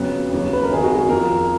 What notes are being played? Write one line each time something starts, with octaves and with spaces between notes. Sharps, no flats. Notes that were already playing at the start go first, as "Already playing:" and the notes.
Already playing: F2 C#3 F#3 B3
D#2 C#3 F#3
B4
A#4
G#1 F#2 D#3 G#4
F#4
G#4
F2 F3 A#4